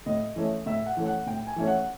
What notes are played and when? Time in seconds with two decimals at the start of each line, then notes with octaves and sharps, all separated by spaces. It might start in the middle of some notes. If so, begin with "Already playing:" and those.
0.06 A2 D#5
0.36 E3 A3 C#4
0.66 A2 E5
0.86 F#5
0.97 E3 A3 C#4
1.06 F#5
1.27 A2 G5
1.47 G#5
1.56 E3 A3 C#4
1.67 F#5